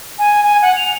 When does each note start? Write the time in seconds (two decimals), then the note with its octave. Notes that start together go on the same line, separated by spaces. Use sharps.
0.19 G#5
0.44 G#5
0.62 F#5
0.76 F7